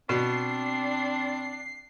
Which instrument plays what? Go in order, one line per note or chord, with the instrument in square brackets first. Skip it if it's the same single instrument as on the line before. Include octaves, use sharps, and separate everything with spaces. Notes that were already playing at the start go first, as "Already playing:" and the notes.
[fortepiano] B2 [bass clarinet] C4 [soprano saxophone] D4 [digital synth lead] C7